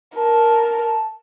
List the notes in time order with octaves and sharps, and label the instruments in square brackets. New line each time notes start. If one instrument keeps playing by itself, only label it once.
[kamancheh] A#4 [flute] A5